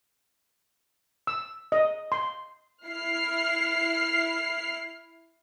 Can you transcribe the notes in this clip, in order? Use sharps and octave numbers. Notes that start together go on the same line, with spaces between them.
E6
D#5
C6
E4 F6 C7